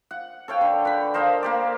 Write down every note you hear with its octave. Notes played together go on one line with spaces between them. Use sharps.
F#5
A4 C#5 F5 G5
D3
B4 B5
A#4 C5 D#5 F5
A#3 G4 D5